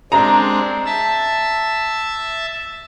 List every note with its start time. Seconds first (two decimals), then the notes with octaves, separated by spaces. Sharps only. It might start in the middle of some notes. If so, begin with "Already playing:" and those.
0.12 G#3 C4 D4 A#5
0.86 E5 A5 E6